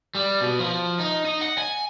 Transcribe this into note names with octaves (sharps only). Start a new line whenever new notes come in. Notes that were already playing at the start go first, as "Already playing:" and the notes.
G3
B2
F3
D#4
D#4
F#5
G#5